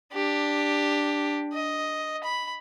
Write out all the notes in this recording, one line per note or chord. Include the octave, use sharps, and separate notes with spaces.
D4 G4
D#5
B5